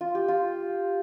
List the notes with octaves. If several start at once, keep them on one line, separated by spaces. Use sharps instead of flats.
F4
G4
F4